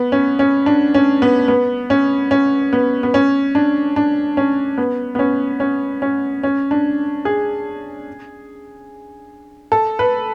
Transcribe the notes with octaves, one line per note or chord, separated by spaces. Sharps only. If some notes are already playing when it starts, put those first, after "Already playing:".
Already playing: B3
C#4
C#4
D4
C#4
B3
B3
C#4
C#4
B3
B3
C#4
D4
D4
C#4
B3
B3
C#4
C#4
C#4
C#4
D4
G#4
A4
B4